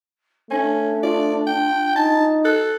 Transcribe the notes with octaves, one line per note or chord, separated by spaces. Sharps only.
A3 C#4 D4 G#5
F4 D5
G5
D#4 A5
A4 F#6